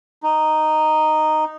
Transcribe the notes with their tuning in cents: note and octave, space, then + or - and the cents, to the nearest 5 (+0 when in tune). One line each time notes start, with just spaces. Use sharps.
D#4 -5